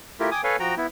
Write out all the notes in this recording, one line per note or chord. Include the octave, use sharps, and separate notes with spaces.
A3 E4 F4 G4 A#4
G5 G#5 D6 D#6
A4 B4 C#5 F5 G#5
F3 F#4 G5 A#5
B3 E4